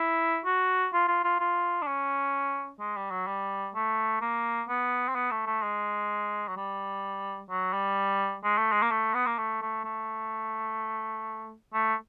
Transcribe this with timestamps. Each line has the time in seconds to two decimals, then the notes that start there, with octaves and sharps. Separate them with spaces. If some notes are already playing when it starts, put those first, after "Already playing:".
Already playing: E4
0.45 F#4
0.93 F4
1.08 F4
1.24 F4
1.40 F4
1.82 D4
1.87 C#4
2.80 G#3
2.96 G3
3.11 F#3
3.27 G3
3.75 A3
4.21 A#3
4.68 B3
5.08 C4
5.15 B3
5.31 A3
5.46 A3
5.62 G#3
6.48 F#3
6.57 G3
7.50 F#3
7.73 G3
8.44 G#3
8.57 A3
8.72 G#3
8.82 A#3
8.91 A3
9.14 B3
9.26 A#3
9.38 A3
9.62 A3
9.85 A3
11.73 A3